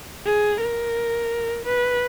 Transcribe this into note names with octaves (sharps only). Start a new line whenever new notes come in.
G#4
A#4
B4